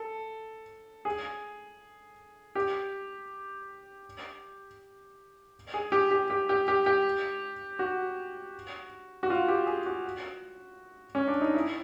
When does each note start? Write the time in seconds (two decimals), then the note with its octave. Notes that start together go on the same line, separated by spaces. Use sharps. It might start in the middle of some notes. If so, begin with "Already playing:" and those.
Already playing: A4
1.05 G#4
2.55 G4
5.74 G#4
5.92 G4
6.11 G4
6.30 G4
6.49 G4
6.68 G4
6.86 G4
7.79 F#4
9.23 F#4
9.30 F4
9.48 G4
9.66 G#4
9.86 F#4
11.15 C#4
11.28 D4
11.41 D#4
11.54 E4